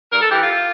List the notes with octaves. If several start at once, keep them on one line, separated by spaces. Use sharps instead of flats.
G2 A#4
A4
E3 G4
F4